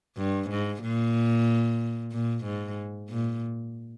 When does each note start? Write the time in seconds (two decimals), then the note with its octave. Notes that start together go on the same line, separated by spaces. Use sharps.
0.17 G2
0.50 G#2
0.83 A#2
2.12 A#2
2.45 G#2
3.09 A#2